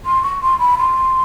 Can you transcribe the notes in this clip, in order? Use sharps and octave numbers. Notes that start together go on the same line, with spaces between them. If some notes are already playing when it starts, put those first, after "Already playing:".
C6
C#6
C6
B5
C6